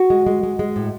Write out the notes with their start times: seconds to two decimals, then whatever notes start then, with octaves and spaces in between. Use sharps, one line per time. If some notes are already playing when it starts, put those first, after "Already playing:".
Already playing: F#4
0.10 G#3
0.26 G#3
0.43 G#3
0.59 G#3
0.76 A2